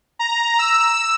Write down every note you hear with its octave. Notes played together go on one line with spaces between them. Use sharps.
A#5
E6